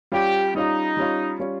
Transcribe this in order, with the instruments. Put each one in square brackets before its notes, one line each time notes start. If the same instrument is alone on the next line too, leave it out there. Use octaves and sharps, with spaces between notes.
[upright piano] G3 C#4 F4 [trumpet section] G4
[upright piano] G3 C#4 F4 [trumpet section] D#4
[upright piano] G3 C#4 F4
G3 C#4 F4